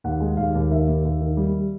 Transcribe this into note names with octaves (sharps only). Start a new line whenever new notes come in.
D#2 F#5
G#3
D#2 F5
D#2
D#3 E5
D#2
D#2
D#3
G3